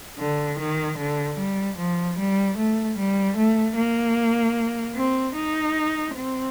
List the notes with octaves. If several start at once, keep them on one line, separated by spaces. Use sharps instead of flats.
D3
D#3
D3
G3
F3
G3
A3
G3
A3
A#3
C4
D#4
C4